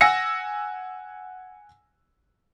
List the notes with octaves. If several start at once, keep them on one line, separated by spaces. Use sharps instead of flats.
F#5 G#5 E6 A#6 C#7